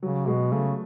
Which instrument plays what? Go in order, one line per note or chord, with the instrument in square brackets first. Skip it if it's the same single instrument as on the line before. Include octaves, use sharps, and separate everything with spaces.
[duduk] C#3 [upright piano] F#3
[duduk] B2 [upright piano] G#3
[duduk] C#3 [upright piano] A3